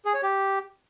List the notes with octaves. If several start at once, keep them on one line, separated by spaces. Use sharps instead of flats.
G#4
C#5
G4